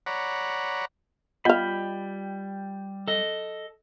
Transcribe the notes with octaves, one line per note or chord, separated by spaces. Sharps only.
C#5 D5 F#5 A#5 B5
G3 B3 F4 D#5 F5 G5 B5
A4 D#5